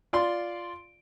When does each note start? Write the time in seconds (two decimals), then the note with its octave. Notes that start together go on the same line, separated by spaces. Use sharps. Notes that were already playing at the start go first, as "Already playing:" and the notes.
0.13 F4 D5 C6